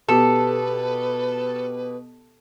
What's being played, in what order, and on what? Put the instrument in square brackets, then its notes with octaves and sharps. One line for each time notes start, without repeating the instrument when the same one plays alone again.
[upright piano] B2 G4 [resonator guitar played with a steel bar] A4 [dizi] B4